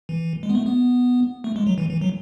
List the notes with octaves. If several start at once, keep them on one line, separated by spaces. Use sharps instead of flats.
E3
G#3
B3
A3
B3
A3
G#3
F#3
E3
E3
F#3